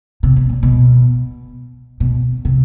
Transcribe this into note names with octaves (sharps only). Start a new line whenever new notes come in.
C3
B2
A#2
B2
B2
C3